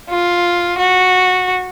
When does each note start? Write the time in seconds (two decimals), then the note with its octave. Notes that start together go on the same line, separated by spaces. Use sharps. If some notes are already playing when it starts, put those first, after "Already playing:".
0.09 F4
0.78 F#4